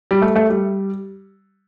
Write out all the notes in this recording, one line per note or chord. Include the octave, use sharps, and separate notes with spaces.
G3
A3
A3
G3